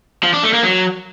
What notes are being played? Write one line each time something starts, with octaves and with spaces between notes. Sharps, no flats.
F3
D4
A3
A#3
F#3